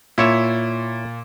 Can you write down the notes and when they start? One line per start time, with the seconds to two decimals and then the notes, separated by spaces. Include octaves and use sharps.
0.18 A#2 E4 C#5 E5